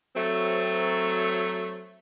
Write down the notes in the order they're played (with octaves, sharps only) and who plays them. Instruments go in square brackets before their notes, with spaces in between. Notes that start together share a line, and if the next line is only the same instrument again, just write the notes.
[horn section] F#3 A3 C4